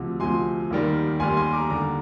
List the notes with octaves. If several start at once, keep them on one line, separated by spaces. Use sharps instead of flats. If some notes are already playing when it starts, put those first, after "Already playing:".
Already playing: D2 C3 F3
D2 C3 F3 G#5 C6
D#2 D#3 G3
D#2 D#3 G3 G#5 C6
G#5 C6
A#5 D6
D#2 D3 G3 A#5 D6